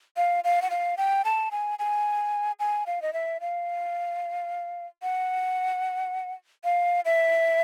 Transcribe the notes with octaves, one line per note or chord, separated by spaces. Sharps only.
F5
F5
F#5
F5
G5
A5
G#5
G#5
G#5
F5
D#5
E5
F5
F#5
F5
E5